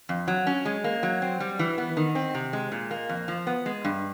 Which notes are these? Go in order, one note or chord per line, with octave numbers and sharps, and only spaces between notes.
F2
F#3
C#4
G#3
A#3
F#3
C4
G3
E3
B3
D#3
C4
C3
G#3
A#2
A#3
F2
F3
B3
G#3
G2